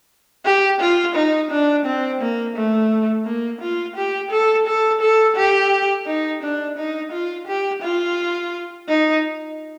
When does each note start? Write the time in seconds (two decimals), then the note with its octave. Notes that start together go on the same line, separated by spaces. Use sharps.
0.45 G4
0.81 F4
1.15 D#4
1.51 D4
1.86 C4
2.21 A#3
2.56 A3
3.26 A#3
3.62 F4
3.96 G4
4.31 A4
4.67 A4
5.01 A4
5.37 G4
6.06 D#4
6.43 D4
6.78 D#4
7.12 F4
7.47 G4
7.82 F4
8.89 D#4